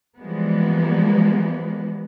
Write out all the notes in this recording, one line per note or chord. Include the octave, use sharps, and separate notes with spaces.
E3 F3 G3 G#3 A#3 B3